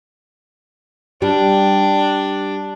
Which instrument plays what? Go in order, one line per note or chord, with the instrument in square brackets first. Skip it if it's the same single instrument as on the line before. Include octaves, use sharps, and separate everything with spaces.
[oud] G3 [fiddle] D4